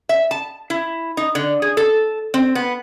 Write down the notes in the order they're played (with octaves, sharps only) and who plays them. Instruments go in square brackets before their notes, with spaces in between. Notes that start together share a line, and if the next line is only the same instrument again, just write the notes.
[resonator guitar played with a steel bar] E5
A5
E4
D#4
D3
G#4
A4
C4
B3